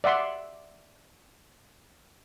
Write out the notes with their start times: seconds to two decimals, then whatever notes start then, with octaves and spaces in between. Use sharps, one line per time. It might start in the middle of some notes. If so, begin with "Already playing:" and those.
0.04 D5 E5 F#5 C6